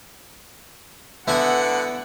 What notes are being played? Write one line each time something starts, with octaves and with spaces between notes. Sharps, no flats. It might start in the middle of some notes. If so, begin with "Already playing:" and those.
D3 B3 E4 E5 F#5 G#5